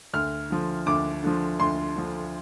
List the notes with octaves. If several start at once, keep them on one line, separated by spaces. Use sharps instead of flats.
D2 F6
D3 F3
D2 D6
D3 F3
D2 C6
D3 F3